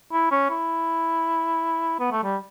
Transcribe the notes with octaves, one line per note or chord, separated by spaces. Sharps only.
E4
C#4
E4
B3
A3
G3